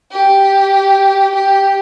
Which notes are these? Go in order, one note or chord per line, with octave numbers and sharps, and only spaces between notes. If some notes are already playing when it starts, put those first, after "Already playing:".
G4
G4